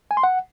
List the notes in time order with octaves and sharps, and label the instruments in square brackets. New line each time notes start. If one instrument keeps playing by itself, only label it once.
[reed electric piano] G#5
C6
F#5